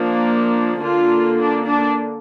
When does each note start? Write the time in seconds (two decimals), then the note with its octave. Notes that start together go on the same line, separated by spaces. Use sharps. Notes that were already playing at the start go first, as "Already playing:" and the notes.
Already playing: F3 A#3 D4
0.80 D3 A#3 D4 F4
1.37 D4
1.65 D4